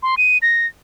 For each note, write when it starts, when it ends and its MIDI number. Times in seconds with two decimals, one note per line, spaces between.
0.03 0.15 84
0.18 0.38 99
0.42 0.66 94